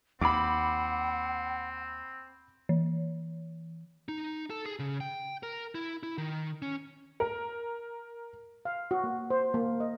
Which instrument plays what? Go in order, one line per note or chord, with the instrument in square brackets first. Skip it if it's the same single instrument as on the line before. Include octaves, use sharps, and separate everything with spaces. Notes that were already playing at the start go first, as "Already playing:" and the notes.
[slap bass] D#2 [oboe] C4 [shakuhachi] F#5 [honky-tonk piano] B5 D6
[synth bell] E3
[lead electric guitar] D#4
A4
G#4
C#3
G5
A#4
E4
E4
D#3
C#4
[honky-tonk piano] A#4
[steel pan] F5
F#4
A#3
C5
A#3
D#5